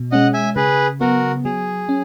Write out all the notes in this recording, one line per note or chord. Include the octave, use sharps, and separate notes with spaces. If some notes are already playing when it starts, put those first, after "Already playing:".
Already playing: B2
G#3 C#4 D#5 F#5
E5 G#5
C#3 G#4 B4
F#3 B3 F#4 A#4
F#3 G#4
C#4